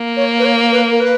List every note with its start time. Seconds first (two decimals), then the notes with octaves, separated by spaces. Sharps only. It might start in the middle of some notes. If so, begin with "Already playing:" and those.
Already playing: A#3
0.17 C#5
0.39 B4
0.45 C#5
0.72 B4
0.91 A#4
1.00 B4